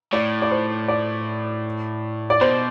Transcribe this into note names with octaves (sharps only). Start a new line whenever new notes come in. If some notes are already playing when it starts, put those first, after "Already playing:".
A2 D5
D5
C5
D5
D5
B2 C5